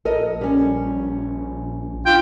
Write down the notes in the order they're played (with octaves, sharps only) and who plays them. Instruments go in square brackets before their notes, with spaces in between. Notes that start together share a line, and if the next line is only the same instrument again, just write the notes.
[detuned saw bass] A#1 [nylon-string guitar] A4 A#4 D#5
[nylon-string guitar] G3 C#4
[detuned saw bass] D4 [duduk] F4 [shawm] G5